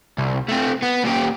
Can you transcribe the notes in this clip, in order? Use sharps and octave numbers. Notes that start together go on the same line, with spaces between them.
C2
A3 C4
B3
A#2 G4